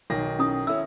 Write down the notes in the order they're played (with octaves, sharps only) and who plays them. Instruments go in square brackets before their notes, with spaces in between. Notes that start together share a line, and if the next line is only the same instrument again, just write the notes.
[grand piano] B1 D#3 A#6
[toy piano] C#4 E4 D#6
[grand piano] C#4 E4 [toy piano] A4 E6